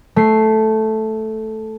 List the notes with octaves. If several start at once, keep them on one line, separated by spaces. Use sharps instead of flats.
A3 C7